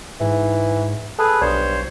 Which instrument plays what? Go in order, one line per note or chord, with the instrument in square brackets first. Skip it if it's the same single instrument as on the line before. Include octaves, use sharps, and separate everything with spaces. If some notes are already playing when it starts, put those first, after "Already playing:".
[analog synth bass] G#2 [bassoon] E3
[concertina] G#4 B4 [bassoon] A4
[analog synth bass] B1 [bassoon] G2 [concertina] C5 C#5